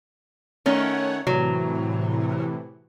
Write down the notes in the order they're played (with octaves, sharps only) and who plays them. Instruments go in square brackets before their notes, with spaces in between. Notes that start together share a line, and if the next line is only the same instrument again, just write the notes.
[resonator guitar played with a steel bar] D#3 C#4 [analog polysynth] A3 C#5 F#5
[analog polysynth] A2 C3 E3 [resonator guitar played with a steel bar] F#3